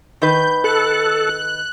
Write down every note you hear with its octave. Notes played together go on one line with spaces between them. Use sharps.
D#3 B4 G6
A4 F#6